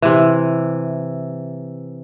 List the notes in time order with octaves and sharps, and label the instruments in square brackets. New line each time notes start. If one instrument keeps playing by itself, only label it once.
[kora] C3 E3